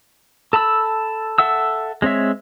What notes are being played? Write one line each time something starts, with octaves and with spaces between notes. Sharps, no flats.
A4 A5 B5 E6
A4 E5 F#5 E6
G#3 C4 C#5 E5